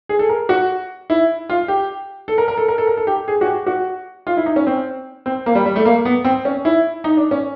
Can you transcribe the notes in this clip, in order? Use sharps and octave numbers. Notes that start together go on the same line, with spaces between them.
G#4
A4
A#4
F#4
E4
F4
G4
A4
A#4
A#4
A4
A#4
A4
A#4
A4
G4
G#4
F#4
G4
F#4
F4
E4
D#4
C#4
C4
C4
A#3
G3
G3
A3
A#3
B3
C4
C#4
E4
D#4
D4
C#4